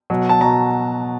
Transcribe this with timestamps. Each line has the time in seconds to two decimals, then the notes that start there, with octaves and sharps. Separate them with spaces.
0.10 B2 F#3
0.29 A5
0.41 B2 F#3 A#5